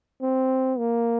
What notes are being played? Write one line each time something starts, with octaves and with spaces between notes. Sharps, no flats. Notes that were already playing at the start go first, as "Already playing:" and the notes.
C4
A#3